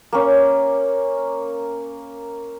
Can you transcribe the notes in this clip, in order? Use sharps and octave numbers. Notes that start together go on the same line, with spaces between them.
A#3 C#4